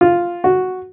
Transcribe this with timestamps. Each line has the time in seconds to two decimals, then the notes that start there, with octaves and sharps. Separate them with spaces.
0.01 F4
0.44 F#4